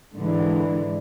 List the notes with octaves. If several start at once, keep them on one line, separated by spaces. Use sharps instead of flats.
G#2 D3 E3